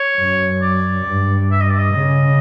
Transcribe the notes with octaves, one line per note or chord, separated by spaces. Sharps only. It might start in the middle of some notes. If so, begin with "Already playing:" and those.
Already playing: C#5
F#2
D5
G2
E5
D#5
D5
D#5
C#3